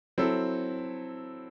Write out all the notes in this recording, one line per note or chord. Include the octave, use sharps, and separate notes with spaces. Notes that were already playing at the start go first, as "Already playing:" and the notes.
F#3 C4 E4 A4